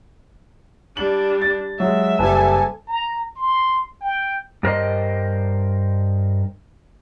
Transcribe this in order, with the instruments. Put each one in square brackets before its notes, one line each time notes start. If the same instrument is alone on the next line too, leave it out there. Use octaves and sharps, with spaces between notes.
[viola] G3 D4 [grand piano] F#7
[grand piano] A6
[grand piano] F#3 G#3 [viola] E5
[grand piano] F#1 G3 [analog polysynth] A4 G#5 A5
[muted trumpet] A#5
C6
G5
[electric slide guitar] G2 A#4 C5 D#5